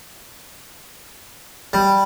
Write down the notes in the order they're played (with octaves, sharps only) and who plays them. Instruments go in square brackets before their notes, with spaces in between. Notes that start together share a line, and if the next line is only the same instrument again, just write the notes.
[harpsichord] G3